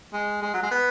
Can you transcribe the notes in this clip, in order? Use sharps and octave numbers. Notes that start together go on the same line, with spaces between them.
G#3
G#3
F#3
G#3
B3